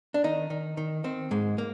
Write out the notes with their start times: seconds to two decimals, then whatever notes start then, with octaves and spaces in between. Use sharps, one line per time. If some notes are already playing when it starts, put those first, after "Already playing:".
0.14 D4
0.24 D#3 D#4
0.50 D#3
0.77 D#3
1.04 D#3 C4
1.31 G#2 G#3
1.58 A#3